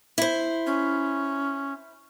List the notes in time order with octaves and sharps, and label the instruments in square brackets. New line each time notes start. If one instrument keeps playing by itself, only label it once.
[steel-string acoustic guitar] E4 C5
[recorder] C#4